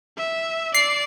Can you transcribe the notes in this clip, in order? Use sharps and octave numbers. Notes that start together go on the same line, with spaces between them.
E5
D5 C7